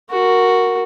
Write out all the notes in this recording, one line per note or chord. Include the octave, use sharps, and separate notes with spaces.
F#4 A#4